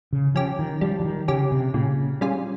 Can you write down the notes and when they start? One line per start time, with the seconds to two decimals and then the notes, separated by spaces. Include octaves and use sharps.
0.13 C#3
0.35 F3 C#4 G4
0.59 D#3
0.81 F3 G3
1.00 F3
1.05 D#3
1.28 C#3 C#4 G4
1.51 C3
1.74 A#2 C#3
2.21 G3 C#4 F4 G#4